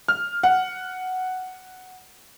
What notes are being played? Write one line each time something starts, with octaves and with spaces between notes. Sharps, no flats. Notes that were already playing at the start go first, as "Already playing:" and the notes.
F6
F#5